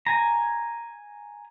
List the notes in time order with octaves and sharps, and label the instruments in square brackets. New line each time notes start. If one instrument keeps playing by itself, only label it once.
[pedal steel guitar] G#5 A#5